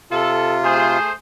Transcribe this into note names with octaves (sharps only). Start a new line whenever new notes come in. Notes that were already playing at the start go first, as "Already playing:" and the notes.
C3 F4 A4
A3 G#4 C5